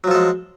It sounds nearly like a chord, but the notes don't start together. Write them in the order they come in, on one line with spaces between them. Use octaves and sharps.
F#3 F3 A4 G#3